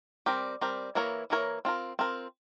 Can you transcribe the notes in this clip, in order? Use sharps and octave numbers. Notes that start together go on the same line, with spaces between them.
G3 C4 G4 A#4
G3 C4 G4 A#4
E3 A#3 E4 A#4 C#5
E3 A#3 E4 A#4 C#5
C4 F4 A#4
C4 F4 A#4